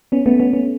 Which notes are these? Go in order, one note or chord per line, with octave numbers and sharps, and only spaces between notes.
B3 C#4
A3 B3
B3 C#4
B3 C#4